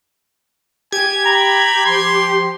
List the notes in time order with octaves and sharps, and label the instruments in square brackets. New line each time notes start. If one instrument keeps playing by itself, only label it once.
[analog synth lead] G4 [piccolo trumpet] G#5 [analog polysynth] G#6
[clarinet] A#5 [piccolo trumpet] B5
[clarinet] F3 [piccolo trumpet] C6